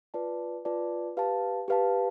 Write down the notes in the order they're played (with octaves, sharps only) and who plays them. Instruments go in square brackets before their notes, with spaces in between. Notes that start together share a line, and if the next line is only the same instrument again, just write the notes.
[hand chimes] F4 B4 D5 A5
F4 B4 D5 A5
G4 B4 F5 A5
G4 B4 F5 A5